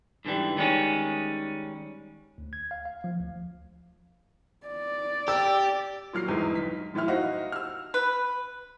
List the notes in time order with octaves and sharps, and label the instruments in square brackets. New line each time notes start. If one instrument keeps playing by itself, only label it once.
[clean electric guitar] G#2 D3 E3 G3
D#3 G3 G#3 C#4
[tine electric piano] D2
G#6
F5
F5
F3
D2
[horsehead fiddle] D5
[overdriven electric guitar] G4 [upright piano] E6
[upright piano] A#2 F#3 F6 C7
G1 E2 G#2 G#3 D#4
B1 B6
F#2 A2 E3 E5 F6
D#4 F#4 C5 D#5 F5
E6 F6
[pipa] B4